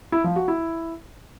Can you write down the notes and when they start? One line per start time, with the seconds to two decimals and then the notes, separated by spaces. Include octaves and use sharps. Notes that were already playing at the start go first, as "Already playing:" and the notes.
0.12 E4
0.24 F3
0.36 F#4
0.48 E4